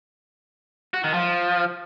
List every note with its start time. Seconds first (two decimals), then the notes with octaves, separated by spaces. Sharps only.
0.94 F#4
1.04 D#3
1.14 F3